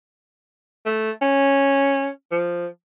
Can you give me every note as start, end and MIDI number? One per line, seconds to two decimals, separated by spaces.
0.86 1.11 57
1.22 2.08 61
2.31 2.67 53